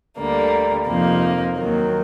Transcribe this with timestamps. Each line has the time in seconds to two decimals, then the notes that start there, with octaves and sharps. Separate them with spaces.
0.18 D2 D3 G3 A#3
0.87 F2 C3 F3 A#3 D#4
1.56 D#2 D#3 F#3